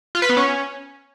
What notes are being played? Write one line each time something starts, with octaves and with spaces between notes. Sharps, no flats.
F4
B4
B3
C#4